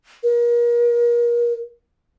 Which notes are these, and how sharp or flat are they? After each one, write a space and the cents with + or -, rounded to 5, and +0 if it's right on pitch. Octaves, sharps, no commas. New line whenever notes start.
A#4 +35